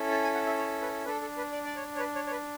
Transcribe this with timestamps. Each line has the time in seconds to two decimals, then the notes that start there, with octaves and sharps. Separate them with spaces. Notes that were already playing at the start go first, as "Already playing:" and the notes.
Already playing: C#4 E4 A4
0.11 A5
0.23 G#5
0.35 F#5
0.47 E5
0.58 C#5
0.82 B4
1.05 D4 A4 B4
1.22 A4
1.37 B4
1.52 D5
1.65 D5
1.76 C#5
1.96 C#5
1.99 B4
2.15 C#5
2.27 C#5
2.31 B4